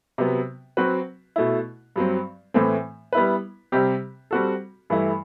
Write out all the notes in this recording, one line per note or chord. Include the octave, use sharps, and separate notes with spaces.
C3 F#3 B3
F#3 C4 F#4 B4
B2 A3 E4
G2 F#3 C4
A2 E3 A3 C4
G3 B3 E4 B4
C3 G3 C4 G4
G3 C4 F#4 A4
G2 E3 A3 E4